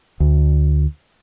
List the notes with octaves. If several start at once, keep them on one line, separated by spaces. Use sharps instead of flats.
D2